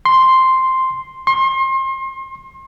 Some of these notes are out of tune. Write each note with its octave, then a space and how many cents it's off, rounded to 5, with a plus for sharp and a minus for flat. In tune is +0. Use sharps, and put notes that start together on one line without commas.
C6 +0
C6 +35